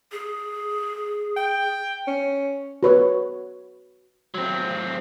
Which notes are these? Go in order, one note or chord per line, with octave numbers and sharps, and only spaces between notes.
G#4
G5
C#4
F#4 B4 C#5
F#3 C4